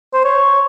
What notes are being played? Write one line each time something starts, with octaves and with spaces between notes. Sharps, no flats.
C5
C#5